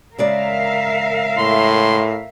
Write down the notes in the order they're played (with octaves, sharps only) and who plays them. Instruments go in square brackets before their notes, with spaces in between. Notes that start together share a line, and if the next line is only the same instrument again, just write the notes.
[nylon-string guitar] C#3 G#3 D5 [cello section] A#4 E5 F5
[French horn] A2 [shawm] C6